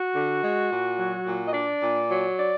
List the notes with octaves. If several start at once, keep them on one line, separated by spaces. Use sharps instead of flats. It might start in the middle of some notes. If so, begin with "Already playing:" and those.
Already playing: F#4
D3
G#3
A#2
F#3
A#2
D#5
D4 D5
A#2
F#3
D5